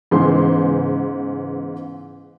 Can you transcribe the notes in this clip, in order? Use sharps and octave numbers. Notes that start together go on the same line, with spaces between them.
G#2 C#3 E3 B3 C6